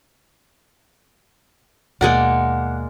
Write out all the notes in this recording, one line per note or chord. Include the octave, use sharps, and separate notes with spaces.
D#2 B2 D#3 G#3 A#3 D5 F#5